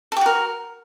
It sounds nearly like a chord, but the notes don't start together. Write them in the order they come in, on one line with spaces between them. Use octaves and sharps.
A4 G4 F#4 A#4